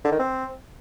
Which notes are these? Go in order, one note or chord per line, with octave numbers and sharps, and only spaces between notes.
D3
D#3
C4